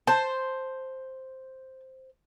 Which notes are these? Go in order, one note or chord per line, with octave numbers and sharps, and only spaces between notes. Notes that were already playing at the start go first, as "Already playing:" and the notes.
C5 A5